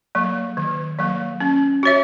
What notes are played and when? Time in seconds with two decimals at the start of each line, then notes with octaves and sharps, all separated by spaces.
0.15 F#3 A#3
0.57 D#3
0.99 F#3 A#3
1.40 C#4
1.83 F#4 C#5 E5